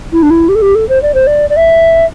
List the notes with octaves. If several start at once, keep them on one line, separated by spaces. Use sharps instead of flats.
E4
D4
E4
G4
A4
G4
A4
C5
D5
C5
D5
D5
E5